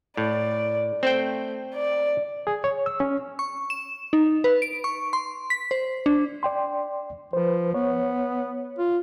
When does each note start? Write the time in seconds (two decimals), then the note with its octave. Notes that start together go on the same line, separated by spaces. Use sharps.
0.17 A2 D5
1.03 A3 C4 C5 G5
1.75 D5
2.47 G#4
2.64 C#5
2.86 E6
3.00 C#4
3.39 C#6
3.70 E7
4.13 D#4
4.44 B4
4.62 D7
4.84 C#6
5.13 C6
5.50 B6
5.71 C5
6.06 D4
6.43 D5 G5 C6
7.33 F3 B4 C5
7.74 B3 C#5
8.78 F4